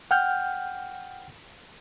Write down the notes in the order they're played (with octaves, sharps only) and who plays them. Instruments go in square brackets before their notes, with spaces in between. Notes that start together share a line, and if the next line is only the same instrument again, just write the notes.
[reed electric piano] F#5 G5 F6 G6